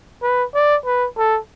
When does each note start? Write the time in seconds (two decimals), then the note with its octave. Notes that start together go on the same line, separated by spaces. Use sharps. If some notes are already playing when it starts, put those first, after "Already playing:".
0.22 B4
0.54 D5
0.85 B4
1.17 A4